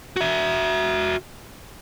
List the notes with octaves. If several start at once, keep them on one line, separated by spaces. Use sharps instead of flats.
F#4 E5